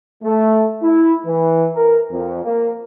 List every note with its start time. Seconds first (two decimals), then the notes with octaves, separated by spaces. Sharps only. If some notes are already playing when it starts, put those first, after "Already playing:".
0.24 A3
0.83 E4
1.26 E3
1.76 A#4
2.12 F2
2.44 A#3